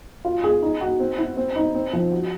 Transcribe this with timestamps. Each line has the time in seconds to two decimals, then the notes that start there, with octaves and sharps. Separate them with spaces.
0.25 F4
0.44 G#4
0.62 D#4
0.81 F#4
1.00 C4
1.18 E4
1.37 C4
1.56 D#4
1.74 C4
1.93 F3
2.12 F#4